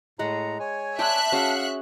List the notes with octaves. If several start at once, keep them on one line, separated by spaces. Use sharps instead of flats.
A2 G#3 F#5 A#5
C#5 G#5
D5 E5 G5 A5 C6 F#6
C#4 F#4 G#4 F5 F#5 C#6